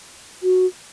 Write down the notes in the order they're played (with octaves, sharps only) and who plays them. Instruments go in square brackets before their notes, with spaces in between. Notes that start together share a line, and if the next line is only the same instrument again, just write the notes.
[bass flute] F#4